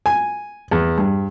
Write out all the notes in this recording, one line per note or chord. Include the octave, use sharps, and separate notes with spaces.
G#5
E2
G2